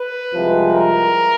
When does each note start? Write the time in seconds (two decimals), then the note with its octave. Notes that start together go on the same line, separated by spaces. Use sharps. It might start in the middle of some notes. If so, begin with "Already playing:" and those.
Already playing: B4
0.33 C2 C3 F3 G#3
0.71 A#4